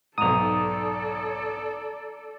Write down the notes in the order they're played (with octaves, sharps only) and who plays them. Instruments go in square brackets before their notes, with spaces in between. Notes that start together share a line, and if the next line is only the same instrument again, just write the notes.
[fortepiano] B1 G#2 [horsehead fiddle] A4 D5 [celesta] A#5 F7 [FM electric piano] D#6